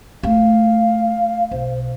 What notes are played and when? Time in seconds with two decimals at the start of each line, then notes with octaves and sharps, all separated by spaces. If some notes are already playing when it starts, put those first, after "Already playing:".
0.23 A3 F5
1.51 B1 C5